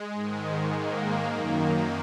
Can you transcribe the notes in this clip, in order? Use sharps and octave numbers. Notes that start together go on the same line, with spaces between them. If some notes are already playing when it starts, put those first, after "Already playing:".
Already playing: G#3
G#2 D#3
A#3
F#2 D#3